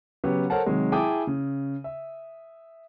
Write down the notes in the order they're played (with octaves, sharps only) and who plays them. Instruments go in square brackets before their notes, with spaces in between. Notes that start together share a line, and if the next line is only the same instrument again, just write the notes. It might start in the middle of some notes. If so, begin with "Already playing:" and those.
[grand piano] C#3 F#3 B3 G4
A4 A#4 C5 C#5 F#5 A5
C3 D#3 F#3 G#3
E4 G#4 G5 A5 D6 D#6
C#3
E5